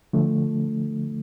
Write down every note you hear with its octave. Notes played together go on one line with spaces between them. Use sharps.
D3 F3 A3